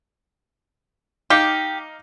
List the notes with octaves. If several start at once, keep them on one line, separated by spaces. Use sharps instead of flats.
D#4 G4 F5 D6